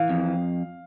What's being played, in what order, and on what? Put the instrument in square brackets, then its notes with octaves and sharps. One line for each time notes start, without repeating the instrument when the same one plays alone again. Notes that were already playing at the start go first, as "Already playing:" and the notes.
Already playing: [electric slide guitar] E3 [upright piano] F5
[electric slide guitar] F2